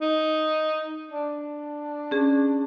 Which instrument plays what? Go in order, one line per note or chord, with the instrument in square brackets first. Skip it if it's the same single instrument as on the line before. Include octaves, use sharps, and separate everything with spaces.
[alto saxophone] D#4
D4
[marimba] C#4 G#4